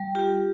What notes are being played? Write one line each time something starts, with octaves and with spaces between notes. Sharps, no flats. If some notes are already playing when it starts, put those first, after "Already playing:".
Already playing: G3
F4 G4